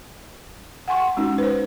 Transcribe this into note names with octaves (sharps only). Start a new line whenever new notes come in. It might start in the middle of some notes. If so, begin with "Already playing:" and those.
F#5 G#5 C6 C#6
G#3 C#4 D#4 F#4
B4 C5